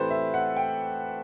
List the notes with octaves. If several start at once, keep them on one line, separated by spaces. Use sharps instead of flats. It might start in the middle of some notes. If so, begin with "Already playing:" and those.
Already playing: A2 E3 A3 C4 G4 A4 B4 C5
E5
F#5
G5